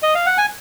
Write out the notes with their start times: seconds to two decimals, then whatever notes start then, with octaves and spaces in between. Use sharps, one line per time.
0.02 D#5
0.15 F5
0.26 F#5
0.38 G#5